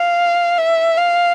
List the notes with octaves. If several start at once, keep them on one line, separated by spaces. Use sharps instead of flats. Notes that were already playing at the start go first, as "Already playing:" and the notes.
Already playing: F5
E5
F5